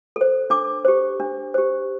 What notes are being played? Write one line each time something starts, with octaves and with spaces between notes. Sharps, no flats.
A4 C5
D4 D6
G4 C5
D4
G4 C5